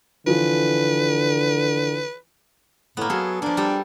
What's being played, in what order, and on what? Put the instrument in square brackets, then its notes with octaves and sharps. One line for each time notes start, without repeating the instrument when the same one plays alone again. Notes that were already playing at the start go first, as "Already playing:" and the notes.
[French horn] D3 [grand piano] E3 F3 [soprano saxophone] B4
[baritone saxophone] A2 [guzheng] A#3 B3
[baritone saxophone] F#3 [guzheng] G#4 A4
[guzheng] F3 A#3 [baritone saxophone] D4
[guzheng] G3 G4 A4